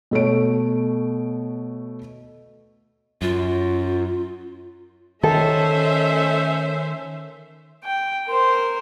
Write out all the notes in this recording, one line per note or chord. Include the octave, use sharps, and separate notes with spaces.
B2 A3 C#5 D7
F#2 F4
D#3 A3 C#4 A4 C5 E5
G5
A#4 C5